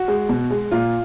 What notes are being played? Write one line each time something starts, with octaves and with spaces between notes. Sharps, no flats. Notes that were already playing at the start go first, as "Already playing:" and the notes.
Already playing: F#4
G#3
B2
G#3
A#2 F4